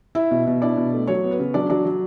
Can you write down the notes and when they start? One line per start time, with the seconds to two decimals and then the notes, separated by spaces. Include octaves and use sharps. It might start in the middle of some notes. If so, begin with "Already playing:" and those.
0.15 E4 E5
0.31 B2
0.47 B2
0.62 D4 E4 D5
0.77 B2
0.93 A3
1.07 F#3 C#5
1.24 B3
1.31 B4
1.39 C#3
1.54 F#3 D4 D5
1.70 F#3 D4 D5
1.85 F#3